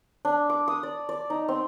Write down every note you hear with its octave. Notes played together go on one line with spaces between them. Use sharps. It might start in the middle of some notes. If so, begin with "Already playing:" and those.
D4
D6
D#6
D5
D5
D#4
C4